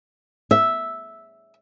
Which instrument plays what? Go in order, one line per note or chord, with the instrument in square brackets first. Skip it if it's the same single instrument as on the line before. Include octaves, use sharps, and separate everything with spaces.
[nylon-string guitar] E5